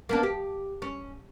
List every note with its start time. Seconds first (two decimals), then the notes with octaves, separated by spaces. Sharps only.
0.09 A#3 B3 D4
0.23 G4
0.82 C#4